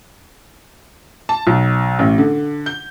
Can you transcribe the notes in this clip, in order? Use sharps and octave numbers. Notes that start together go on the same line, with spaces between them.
A5
B1
A1
D3
G6